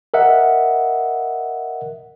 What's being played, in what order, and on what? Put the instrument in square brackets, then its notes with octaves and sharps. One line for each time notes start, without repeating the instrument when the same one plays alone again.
[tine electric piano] A#4 D#5 E5 F#5